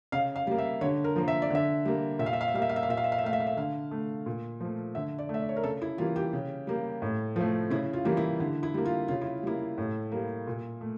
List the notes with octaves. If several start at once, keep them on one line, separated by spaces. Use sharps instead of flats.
C#3 F5
F5
G3 A#3
E5
D3 C#5
A#4
F3 A#3
E5
D5
D3 E5
G3 A#3
A#2 E5
F5
E5
F5
E5
G3 A#3 E5 F5
F5
E5
F5
A#2 E5
F5
E5
F5
E5
A3 F5
E5
F5
E5
D3 F5
A3
A#2
F3 A3
D3 E5
D5
A3
E5
D5
C#5
A#4
C#3 A4
E4
E3 G3 A#3 F4
G4
C#3
G3 A#3
A2
F3 A3
C#3 E4
F4
E3 G3 A#3
E4
D3 E4
E4
G3 A#3
F4
C#3 F4
E4
G3 A#3 E4
A2
G3 A#3
A#2
A3